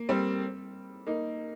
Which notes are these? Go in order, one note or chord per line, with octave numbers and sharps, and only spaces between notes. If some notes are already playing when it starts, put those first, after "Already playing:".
Already playing: A#3
G3 C4
A#3 D#4